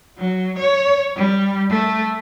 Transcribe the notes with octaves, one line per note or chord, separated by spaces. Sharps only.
F#3
C#5
G3
A3